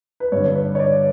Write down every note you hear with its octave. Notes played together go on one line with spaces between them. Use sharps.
B4
G2 D3 C#5
C#5
B4
C#5
D5